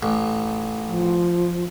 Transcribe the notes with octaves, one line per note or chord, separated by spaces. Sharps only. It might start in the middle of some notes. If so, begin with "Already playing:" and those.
A1
F3